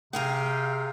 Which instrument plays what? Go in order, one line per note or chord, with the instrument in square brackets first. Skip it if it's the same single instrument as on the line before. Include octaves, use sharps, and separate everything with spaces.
[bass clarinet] C3 [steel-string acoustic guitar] G#4 G#5 A#5 [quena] F5 [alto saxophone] G5